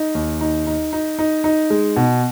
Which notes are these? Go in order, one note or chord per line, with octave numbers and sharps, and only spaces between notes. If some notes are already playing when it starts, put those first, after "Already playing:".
Already playing: D#4
D#2
D#4
D#4
D#4
D#4
D#4
G#3
B2